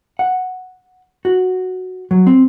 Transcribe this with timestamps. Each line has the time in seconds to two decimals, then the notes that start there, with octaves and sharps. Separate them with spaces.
0.19 F#5
1.25 F#4
2.11 F#3
2.27 C4